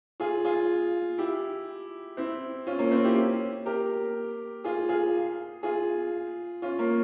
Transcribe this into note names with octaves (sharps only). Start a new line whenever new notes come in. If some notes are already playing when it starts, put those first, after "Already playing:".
F4 G#4
F4 G#4
E4 G4
C4 E4
C#4 F4
A#3 C#4
C4
E4 G4
G4 A#4
F4 G#4
F4 G#4
F4 G#4
C#4 F4
A#3 C#4